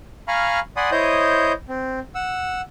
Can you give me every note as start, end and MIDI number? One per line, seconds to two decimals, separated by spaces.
0.28 0.60 77
0.28 0.60 80
0.28 0.60 82
0.28 0.60 83
0.28 0.60 85
0.28 0.60 89
0.77 0.90 74
0.77 0.90 78
0.77 0.90 80
0.77 0.90 83
0.77 0.90 84
0.77 0.90 87
0.92 1.52 64
0.92 1.52 72
0.92 1.52 73
0.92 1.52 75
0.92 1.52 87
0.92 1.52 91
1.69 2.00 60
2.15 2.61 78
2.15 2.61 88